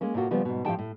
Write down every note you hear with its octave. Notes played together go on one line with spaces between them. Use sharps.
G#3 A#3 C#4
A2 C3 A#3 F4 F#4
C#3 F3 G3 B3
G#2 B2
A2 F3 C4 G4 G5 A5
A2